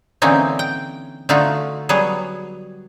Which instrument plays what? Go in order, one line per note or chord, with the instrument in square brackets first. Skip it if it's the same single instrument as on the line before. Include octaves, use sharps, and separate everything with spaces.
[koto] D3 E3 A#3 C4 C#4 D#4
G5
D3 A3 D#4 F4 F#4
F#3 G3 B3 G#4